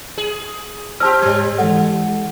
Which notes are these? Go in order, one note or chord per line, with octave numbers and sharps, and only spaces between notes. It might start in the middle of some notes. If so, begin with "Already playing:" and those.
G#4
C4 G4 A5 E6 F6
G#2 G3 C#5 G#6
E3 G#3 A4 F#5